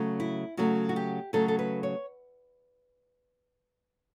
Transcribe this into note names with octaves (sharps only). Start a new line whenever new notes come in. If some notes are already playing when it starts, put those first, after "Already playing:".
Already playing: C#3 F#3 A3
E4
C#3 F#3 A3 F#4
F#4
G4
C#3 F#3 A3 A4
A4
B4
C#5